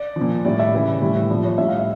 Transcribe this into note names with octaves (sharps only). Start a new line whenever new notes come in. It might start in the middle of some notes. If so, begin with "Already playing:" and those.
Already playing: D5
F3
A#2
A2 G3 D5
E5
C#3 E3 G3
A2 E3 G3
A#2 F3 D5
C#5
A2 G3 E5
F5
E5